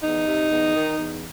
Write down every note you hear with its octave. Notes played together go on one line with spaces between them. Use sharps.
E2 D#4
C3
E2
D#3
E2